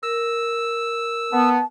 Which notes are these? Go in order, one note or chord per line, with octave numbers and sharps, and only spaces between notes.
A#4 E6
B3 A5